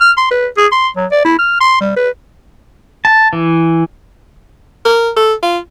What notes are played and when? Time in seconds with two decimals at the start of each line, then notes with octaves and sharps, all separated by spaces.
0.01 F6
0.18 C6
0.31 B4
0.57 G#4
0.72 C6
0.96 F#3
1.12 D5
1.25 E4
1.39 F6
1.60 C6
1.81 G3
1.96 B4
3.05 A5
3.33 E3
4.85 A#4
5.17 A4
5.43 F4